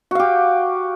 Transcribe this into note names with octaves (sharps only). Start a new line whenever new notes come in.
F#4 G4 F5